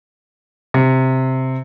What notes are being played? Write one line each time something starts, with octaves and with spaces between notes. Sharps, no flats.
C3